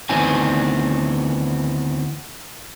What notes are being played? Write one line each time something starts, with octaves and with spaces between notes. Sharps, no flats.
D2 D#3 E3 B3 C4 G#5